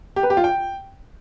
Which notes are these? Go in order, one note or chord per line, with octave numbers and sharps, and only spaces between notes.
G4
B4
G4
F4
G5